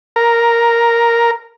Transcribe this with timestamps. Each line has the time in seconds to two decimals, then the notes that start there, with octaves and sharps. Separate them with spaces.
0.16 A#4